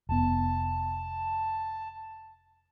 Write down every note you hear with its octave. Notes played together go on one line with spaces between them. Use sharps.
F1 B3 A5